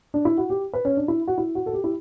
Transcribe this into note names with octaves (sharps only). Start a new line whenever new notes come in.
D4
E4
F#4
G4
B4
C#4
D4
E4
F#4
E4
F#4
A4
G4
E4